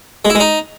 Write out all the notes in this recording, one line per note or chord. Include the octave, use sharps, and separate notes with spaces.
G#3
E4
G#3
D#4